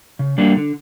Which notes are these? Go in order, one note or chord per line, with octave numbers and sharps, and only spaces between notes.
C#3
G3 A#3 D4
D3